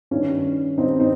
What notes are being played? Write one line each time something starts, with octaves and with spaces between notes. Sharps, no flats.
G2 D#3 C#4
G2 D#3 C4 D#4
C4 D#4